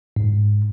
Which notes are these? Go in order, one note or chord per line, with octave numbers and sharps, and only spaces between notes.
G#2